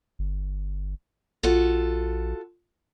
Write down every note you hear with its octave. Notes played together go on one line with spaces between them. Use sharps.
G1
A#1 F4 F#4 A4